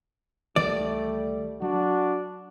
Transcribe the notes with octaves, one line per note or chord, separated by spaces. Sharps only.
C#2 D#3 E3 G3 A3 D5
F#3 D4 F#4